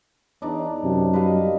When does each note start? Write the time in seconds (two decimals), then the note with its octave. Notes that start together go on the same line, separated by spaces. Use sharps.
0.42 E2 D4 D#4 D5
0.83 F#2 C3
1.13 G3 B4 D#5 F5